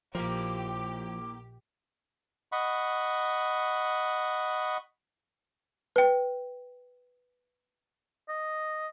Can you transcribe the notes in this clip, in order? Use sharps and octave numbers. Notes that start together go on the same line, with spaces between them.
A#1 F3 A#3 E4 G4 A#4 D6
D#5 F#5 B5 C#6
B4 G5
D#5